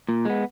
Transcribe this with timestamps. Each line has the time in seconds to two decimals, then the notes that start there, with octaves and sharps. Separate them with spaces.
0.09 A#2
0.25 G#3 B3